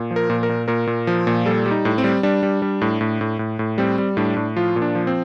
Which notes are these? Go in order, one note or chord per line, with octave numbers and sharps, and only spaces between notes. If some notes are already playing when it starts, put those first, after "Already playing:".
Already playing: A#2
F3
A#4
A#2
A#4
A#2
A#2 A#4
A#2
F3
A#2
G3 A4
G3
D#4
A2
C4
G3
G3 D4
G3
G3
A2
A2
A2
A2
A2
G3 C4
G3
A2 D4
A2
F3 F4
A#2
D4
F3
C4